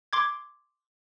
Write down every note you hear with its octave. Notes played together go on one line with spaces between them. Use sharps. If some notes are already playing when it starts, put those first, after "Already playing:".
C6 D6 G#6